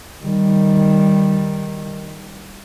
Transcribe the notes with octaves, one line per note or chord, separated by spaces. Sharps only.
D#3 G3